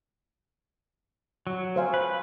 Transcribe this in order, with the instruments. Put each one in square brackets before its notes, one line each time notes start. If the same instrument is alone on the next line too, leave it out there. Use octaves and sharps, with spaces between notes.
[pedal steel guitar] F#3
[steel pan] C5 F5 G#5
[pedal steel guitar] B4